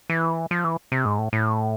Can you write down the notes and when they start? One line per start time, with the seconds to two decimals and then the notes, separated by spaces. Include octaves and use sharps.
0.10 E3
0.51 F3
0.64 E3
0.92 C3
1.05 G#2
1.18 A2
1.33 A2